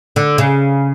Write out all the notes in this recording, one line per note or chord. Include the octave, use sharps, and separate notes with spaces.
D3
C#3